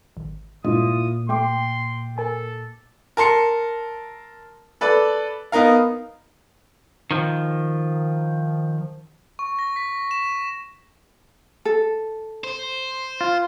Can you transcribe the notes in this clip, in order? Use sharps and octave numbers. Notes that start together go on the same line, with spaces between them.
G#1
G2 A#2 G#3 E4 F4 D#6
A3 G5 C6 D6
A4 A#4 G#5
A#4 A5 C6 C#7
A4 B4 D5
B3 D#4 A#4 F5
D#3 F3
C#6
A#6
B6
E7
A4
C5
F4